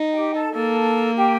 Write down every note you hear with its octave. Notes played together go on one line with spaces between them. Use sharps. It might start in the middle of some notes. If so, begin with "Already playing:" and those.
Already playing: D#4
G4 G5
A4 A5
A#3 A4 A5
G4 G5